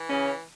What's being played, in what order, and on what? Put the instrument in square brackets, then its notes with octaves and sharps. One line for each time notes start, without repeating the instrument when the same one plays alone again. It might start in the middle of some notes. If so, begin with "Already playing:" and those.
Already playing: [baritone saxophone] E3
[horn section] C#3 C#4